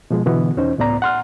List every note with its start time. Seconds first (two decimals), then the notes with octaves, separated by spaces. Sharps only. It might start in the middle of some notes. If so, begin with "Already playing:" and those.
0.11 B2 F3 G#3
0.26 B2 D3 E3 B3
0.57 E2 C#4 D#4 C5
0.78 C#2 A2 B3 D5 A#5
1.02 F#5 C6 F6